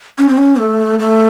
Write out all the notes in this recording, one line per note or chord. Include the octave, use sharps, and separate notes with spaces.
C#4
C4
C#4
A3
A3